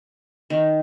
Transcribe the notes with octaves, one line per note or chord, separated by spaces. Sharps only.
D#3